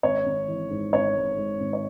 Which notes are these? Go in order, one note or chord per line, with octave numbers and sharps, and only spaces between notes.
G#1 C#5
G#1
E3
G#2
G#1 C#5
G#2
G#2
G#1
C#5